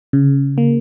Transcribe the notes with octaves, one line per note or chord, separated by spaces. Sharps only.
C#3
A#3